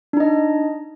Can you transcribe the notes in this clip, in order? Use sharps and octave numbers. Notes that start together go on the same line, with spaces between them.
D4 D#4 D#5